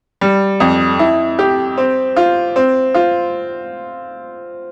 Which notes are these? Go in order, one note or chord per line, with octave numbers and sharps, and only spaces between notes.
G3
F2
E4
G4
C4
F4
C4
F4